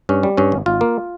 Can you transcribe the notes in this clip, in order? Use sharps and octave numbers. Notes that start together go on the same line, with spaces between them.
G2 C#4
G3
G2 C#4
G#1
G#1 F4
A#3